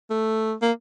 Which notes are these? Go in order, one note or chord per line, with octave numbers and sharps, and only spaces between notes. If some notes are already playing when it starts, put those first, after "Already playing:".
A3
A#3